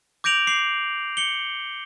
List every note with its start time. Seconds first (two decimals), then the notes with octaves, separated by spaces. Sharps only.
0.24 D6 G6 A#6 D7 F7 F#7
0.47 D6 C7 F#7
1.17 C#7 F#7 G7